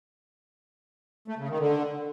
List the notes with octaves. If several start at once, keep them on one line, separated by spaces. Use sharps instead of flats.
A3
C#3
D#3
D3